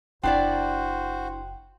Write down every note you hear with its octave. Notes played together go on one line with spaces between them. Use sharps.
F#1 D4 E4 F#4 C5 D5 G5